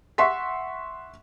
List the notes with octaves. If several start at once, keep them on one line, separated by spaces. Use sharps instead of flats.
E5 F#5 C6 C#6 B6